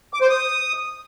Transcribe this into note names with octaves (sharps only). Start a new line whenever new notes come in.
D6
C5
D#6